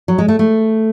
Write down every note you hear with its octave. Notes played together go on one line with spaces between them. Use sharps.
F#3
G#3
A3
A3